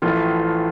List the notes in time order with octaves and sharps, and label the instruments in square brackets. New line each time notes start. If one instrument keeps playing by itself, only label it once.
[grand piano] A1 A2 F3 A3 F4